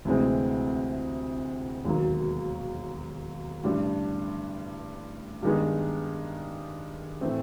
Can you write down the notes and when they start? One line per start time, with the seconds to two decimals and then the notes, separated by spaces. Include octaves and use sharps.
0.05 D2 C3 E3 G#3 C4
1.84 E1 D#2 D#3 F#3 A#3
3.63 A1 G2 D3 G3
5.42 G2 D#3 G#3 B3
7.21 A2 E3 A3 C4